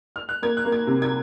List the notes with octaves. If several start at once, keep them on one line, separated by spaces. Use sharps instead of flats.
F6
F#6
A#3 G#6
F#6
A#3
G#6
C3
G#6